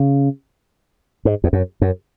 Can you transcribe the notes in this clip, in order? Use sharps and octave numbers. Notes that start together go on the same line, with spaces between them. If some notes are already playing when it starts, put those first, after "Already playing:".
Already playing: C#3
G#2
E2
F#2
F#2